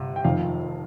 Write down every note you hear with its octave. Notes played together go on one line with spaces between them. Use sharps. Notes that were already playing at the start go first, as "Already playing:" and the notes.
Already playing: G1 C3
G5
F1 F2 D#3 F5